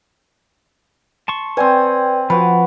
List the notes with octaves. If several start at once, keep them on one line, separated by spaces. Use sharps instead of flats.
A5 C6 C#6
C4 B4 D5 G5 G#5
F3 F#4 B4 B5